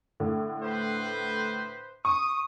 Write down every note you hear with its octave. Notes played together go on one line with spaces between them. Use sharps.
A2 D3
B4 C5
C#6 D#6